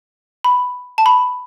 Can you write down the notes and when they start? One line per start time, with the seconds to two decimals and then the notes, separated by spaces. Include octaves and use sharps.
0.44 B5
0.98 A5
1.06 B5